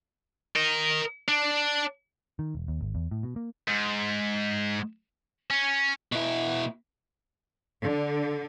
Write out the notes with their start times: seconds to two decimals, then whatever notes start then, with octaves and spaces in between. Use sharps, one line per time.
0.56 A#4 D#5
1.28 D4
2.39 D#3
2.55 E1
2.68 D#2
2.81 G#1
2.95 E2
3.11 A2
3.23 B2
3.36 A#3
3.68 G#2
5.50 C#4
6.12 B2 E4
7.82 D3